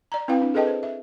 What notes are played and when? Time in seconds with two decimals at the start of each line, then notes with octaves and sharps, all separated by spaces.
0.12 D5 A#5
0.28 C4 E4 B4 F5 G5
0.41 D4
0.54 G#4 A4 B4 D#5 G5 A5
0.67 C5
0.83 E5